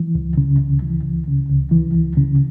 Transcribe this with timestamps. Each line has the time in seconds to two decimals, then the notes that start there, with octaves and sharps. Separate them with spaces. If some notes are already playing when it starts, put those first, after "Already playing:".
Already playing: E3
0.15 C#2
0.37 C#3
0.59 C#2
0.82 E3
1.04 C#2
1.27 C#3
1.49 C#2
1.71 E3
1.94 C#2
2.17 C#3